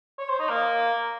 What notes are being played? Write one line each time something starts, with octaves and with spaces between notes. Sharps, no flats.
C#5
C5
D#4
A#3